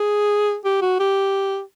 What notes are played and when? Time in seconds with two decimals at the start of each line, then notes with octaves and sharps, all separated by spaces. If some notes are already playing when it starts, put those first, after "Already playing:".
Already playing: G#4
0.65 G4
0.82 F#4
1.00 G4